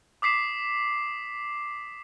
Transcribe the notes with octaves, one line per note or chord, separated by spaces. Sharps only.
D6 D#6 B6 C7 E7